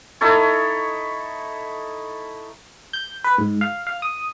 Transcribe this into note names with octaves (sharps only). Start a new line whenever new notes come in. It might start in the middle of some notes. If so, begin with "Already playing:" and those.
D#4 E4 A4 C#5
G6
B4
G#2
F5
F5
D#6